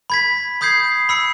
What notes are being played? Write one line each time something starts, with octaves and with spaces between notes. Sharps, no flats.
B5 G#6 B6
B5 D#6 G6 G#6 C7
B5 E6 C#7